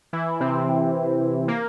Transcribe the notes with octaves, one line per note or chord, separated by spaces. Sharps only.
E3 E4
C3 C4
A#3